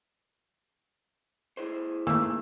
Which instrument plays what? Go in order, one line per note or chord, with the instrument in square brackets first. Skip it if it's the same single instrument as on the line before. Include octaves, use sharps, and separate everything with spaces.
[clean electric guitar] E4 G#4 C5
[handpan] D#3 [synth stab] A3 A#3 [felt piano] E6